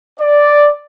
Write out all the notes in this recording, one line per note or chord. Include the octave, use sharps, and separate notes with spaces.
D5